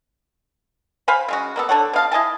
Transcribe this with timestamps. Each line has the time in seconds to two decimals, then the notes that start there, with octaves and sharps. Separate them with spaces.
1.08 C5 F5 G#5 B5
1.28 C#3 G#3 F#4
1.56 A#3 B3 A4
1.69 D3 A4 C#5 F#5
1.93 B2 F5 A5
2.12 E4 D#5 G#5 A5